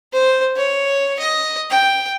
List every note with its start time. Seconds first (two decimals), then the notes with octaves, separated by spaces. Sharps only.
0.13 C5
0.57 C#5
1.20 D#5
1.70 G5